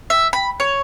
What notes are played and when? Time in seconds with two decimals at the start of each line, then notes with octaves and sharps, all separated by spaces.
0.10 E5
0.33 B5
0.60 C#5